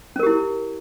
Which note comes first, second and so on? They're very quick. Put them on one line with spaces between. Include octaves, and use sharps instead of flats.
C#4 A#4 G4 E4